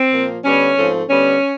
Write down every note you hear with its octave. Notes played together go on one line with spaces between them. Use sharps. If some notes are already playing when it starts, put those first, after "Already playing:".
Already playing: C4
A#2 F3 A#3
D3 G3 B3 C#4
G#2 F3 A3 C4
D3 G3 B3 C#4